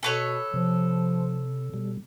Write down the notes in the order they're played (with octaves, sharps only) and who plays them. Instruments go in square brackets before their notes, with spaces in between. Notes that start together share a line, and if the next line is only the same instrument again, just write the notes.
[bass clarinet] B2 [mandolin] A4 B4 C#5
[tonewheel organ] C3 [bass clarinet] F3
[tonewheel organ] B2 G3